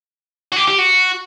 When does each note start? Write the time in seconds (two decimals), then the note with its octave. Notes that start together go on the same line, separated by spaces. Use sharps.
0.52 F#4
0.56 G4
0.68 G4
0.78 F#4